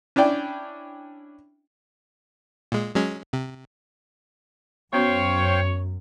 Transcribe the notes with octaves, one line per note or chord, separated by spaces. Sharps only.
C#4 D4 E4 D5 G5
A#2 G#3
F#3 G#3 C#4
C3
F#2 B3 C#4 F#4 C5 C#5 F5 G5